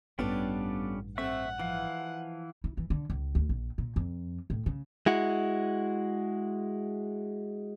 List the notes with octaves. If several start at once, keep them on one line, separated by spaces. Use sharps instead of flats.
A1 G2 G3 B3 C#4 D4 F4 A4
A3 C4 E5 F#5 C#6
E3 F3 F5
E4
E3
D3
C#2
D2
A#1
A#2
F2
A2
C#3
G#3 E4 F#4